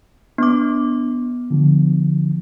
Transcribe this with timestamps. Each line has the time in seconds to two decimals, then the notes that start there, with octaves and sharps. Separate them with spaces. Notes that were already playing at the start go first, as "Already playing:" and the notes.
0.38 B3 D4 D6
1.50 D3 F3